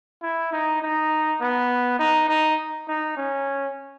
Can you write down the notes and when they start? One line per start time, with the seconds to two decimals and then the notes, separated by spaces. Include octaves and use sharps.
0.22 E4
0.53 D#4
0.82 D#4
1.41 B3
1.99 D#4
2.29 D#4
2.88 D#4
3.17 C#4